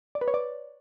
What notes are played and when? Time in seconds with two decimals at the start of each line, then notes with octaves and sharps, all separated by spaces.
0.15 D5
0.21 B4
0.28 C#5
0.34 D5